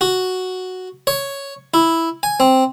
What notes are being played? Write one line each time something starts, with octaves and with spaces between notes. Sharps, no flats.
F#4
C#5
E4
G#5
C4